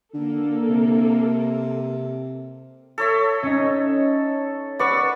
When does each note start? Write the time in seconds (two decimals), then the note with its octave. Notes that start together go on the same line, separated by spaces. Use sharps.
0.14 D3 A#3 A4
0.69 C3
2.98 A4 C#5 E5
3.43 C#4 D#4
4.79 B4 D5 F#5 C#6 E6